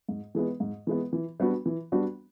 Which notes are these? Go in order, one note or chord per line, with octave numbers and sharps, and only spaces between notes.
G#2
E3 G#3 B3
G#2
E3 G#3 B3
E3
G3 B3 D4 F#4
E3
G3 B3 D4 F#4